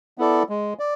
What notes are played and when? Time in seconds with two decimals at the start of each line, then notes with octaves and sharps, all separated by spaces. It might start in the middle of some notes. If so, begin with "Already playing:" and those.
0.18 B3 E4 A4 D5
0.49 G#3
0.79 D5